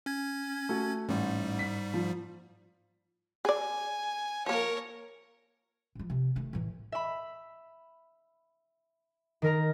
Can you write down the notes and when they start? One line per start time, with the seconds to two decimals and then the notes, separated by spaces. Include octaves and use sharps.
0.06 C#4 G#6
0.69 A3 F#4
1.09 A1 G#2 G3
1.59 B6
1.94 F3
3.45 G#4 D5 G#5
4.46 F3 A#3 A#4 C#5
5.95 G#2 F3
6.10 C3
6.36 D#3 A3
6.53 A2 E3
6.92 E5 B5
9.42 D#3 A#4 A#5